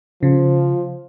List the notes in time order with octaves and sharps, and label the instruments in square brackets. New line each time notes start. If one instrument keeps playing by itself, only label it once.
[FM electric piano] C#3 [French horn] F3